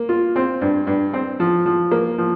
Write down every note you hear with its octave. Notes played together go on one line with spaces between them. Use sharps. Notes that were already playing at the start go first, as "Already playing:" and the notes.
Already playing: A#3
F4
C4
G2
G2
C4
F3
F3
A#3
F3